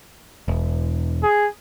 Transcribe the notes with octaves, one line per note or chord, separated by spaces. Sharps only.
E1
G#4